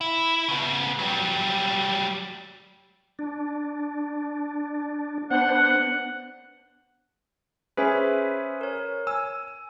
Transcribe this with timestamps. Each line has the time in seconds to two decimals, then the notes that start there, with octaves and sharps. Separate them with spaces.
0.01 E4
0.48 C#3 B3
0.99 F#3 G3
3.19 D4
5.31 B3 D4 C5 F#5
7.77 C#4 G#4 B4 C5 E5 G#5
8.61 A#4 C#5
9.07 G#5 E6